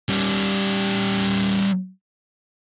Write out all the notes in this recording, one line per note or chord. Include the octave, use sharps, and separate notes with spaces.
G3 C#4